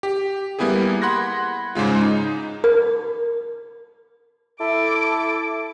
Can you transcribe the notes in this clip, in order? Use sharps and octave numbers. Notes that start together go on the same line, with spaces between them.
G4
G3 A#3 B3 E4 G4 G#4
F#5 B5 C6 F#6 G#6 A#6
G#2 C#3 G#3 F4
D#4
A#4
E4 A4 D6